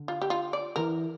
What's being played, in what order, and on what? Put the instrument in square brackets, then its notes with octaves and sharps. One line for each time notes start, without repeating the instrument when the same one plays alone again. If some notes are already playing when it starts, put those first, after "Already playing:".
Already playing: [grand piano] D3
[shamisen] F4
G4
F4
D5
[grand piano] E3 [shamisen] A#4